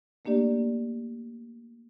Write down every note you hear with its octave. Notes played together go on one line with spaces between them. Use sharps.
A3 A#3 D4 G4 D5